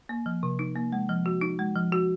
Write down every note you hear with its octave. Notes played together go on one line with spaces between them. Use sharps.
A#3
F3
C3
D#4
A#3
G#3
F3
F#4
D#4
G#3
F3
F#4